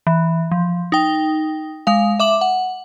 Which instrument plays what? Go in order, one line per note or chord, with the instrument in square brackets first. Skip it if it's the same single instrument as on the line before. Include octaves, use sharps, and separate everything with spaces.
[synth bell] E3
F3
D#4 G5
G#3 F5
E5 D6 F#7
F#5